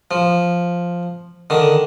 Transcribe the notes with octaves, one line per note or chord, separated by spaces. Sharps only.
F3
D3 D#3